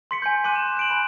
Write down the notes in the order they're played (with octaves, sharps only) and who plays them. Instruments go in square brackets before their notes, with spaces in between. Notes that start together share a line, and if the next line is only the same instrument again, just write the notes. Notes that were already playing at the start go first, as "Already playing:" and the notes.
[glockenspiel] C6 B6 C#7
G#5 C6 G6
G#5 C6 D6 F#6 D#7
E7
F#6 D7 F#7
G#5 B5